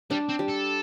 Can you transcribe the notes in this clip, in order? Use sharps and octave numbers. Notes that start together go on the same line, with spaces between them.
G3 D4
C4
G3
A4